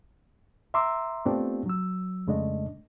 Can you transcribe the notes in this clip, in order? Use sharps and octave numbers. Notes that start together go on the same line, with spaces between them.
E5 A#5 C6 D6 E6
A3 B3 C4 D4 F4 G4
F#3 E6
F2 C#3 G#3 A3 D4 D#5